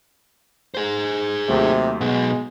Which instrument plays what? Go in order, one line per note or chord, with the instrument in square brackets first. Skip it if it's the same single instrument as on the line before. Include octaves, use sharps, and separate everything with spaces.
[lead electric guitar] G#4 C5
[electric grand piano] D#2 F#3 A3 [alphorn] C3
[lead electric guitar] B2 F#3 [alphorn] G#3 [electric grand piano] B3